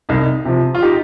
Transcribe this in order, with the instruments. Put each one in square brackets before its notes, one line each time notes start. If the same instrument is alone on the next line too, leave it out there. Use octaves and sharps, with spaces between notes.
[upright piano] C2 D#4
C3 F3
F4
D#4 G4